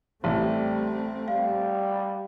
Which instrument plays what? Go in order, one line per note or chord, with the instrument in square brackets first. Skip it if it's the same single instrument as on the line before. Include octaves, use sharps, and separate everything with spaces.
[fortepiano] A1 [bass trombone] G3 [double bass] A3 C4
[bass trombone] G3 [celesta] F5